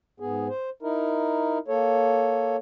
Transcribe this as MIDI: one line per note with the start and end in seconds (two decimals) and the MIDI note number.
0.20 0.48 44
0.20 0.48 59
0.20 0.48 68
0.48 0.70 72
0.82 1.58 63
0.82 1.58 64
0.82 1.58 70
1.68 2.57 58
1.68 2.57 69
1.68 2.57 73